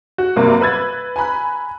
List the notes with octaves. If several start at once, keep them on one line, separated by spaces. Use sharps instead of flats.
F#4
G2 C3 F#3 A#3
B4 E6 G#6 A6
G#5 A#5 B5 F#6